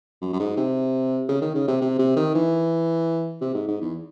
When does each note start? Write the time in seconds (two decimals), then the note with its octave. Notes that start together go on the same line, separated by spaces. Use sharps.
0.21 F#2
0.33 F#2
0.39 G#2
0.57 C3
1.28 C#3
1.41 D#3
1.55 C#3
1.67 C3
1.81 C3
1.98 C3
2.16 D#3
2.34 E3
3.41 C3
3.54 G#2
3.68 G#2
3.81 E2